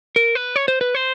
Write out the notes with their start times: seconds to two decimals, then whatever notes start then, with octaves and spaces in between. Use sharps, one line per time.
0.16 A#4
0.35 B4
0.56 C#5
0.68 C5
0.81 B4
0.95 C5